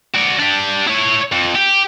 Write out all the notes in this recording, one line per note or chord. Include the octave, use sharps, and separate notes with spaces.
F#4 D5
D4 G4
E4 C#5
F2
G4